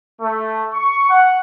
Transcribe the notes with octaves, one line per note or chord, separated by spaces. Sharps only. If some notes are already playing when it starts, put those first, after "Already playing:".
A3
C#6
F#5